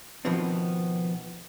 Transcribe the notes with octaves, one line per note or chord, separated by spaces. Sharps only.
B2 D#3 F3 B3 C4